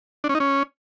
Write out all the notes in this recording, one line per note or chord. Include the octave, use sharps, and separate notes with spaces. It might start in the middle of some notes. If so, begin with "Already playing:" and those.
D4
C#4
D#4
C#4